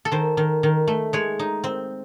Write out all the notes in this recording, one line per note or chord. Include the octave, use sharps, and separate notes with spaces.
A4
D#3 C5
D#3
D#3
A3
G#3 C#5
D#4
C4